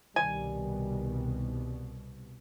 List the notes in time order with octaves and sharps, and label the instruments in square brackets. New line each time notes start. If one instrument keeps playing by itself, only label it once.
[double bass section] C2 B2 [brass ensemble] D#3 G3 [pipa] G#5